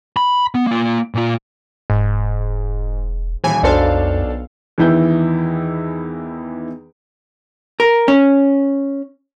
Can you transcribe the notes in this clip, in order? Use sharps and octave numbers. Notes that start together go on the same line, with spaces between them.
B5
B3
A#3 F4
A#2 F4
E1 G#2
D#1 E3 G#5
B1 F2 D4 A4 C5 F5
E2 D#3 E3 E4 G6
A#4
C#4